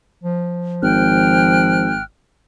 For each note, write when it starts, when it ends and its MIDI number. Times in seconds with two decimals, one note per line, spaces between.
0.24 1.93 53
0.82 2.02 32
0.82 2.03 79
0.82 2.03 89
0.82 2.03 90